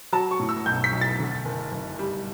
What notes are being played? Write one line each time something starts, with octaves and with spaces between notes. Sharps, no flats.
F#3 A5
C#6
A2
E6
B1 G6
B6
B1
A6
D3
F#1
F#1
G3